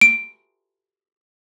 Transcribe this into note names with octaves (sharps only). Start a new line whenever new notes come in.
D7